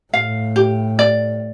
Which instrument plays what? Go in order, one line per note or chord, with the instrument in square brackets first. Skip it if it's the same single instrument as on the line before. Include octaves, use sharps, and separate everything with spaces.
[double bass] A2 [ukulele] F5
[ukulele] G4
D5